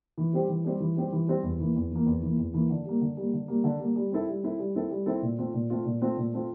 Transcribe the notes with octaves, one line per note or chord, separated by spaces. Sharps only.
E3
G3 C4 G4 C5
E3
G3 C4 G4 C5
E3
G3 C4 G4 C5
E3
G3 C4 G4 C5
E2
E3 A#3
E2
E3 A#3
E2
E3 A#3
E2
E3 A#3
D3
G3 A#3
D3
G3 A#3
D3
G3 A#3
D3
G3 A#3
G3
C4 E4 A4
G3
C4 E4 A4
G3
C4 E4 A4
G3
C4 E4 A4
A#2
A3 C4 F4
A#2
A3 C4 F4
A#2
A3 C4 F4
A#2
A3 C4 F4